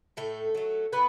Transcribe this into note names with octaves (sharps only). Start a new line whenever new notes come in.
A2 A3 A4
F#3 A3
A2 B3 B4